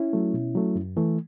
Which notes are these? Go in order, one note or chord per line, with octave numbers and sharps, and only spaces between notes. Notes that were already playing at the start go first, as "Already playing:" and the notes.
Already playing: C#4 E4
F#3 A3
B2
F#3 A3
F#2
E3 A3